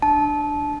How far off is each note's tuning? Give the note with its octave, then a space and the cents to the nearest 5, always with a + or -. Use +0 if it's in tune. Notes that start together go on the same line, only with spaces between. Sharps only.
D4 +10 A5 -20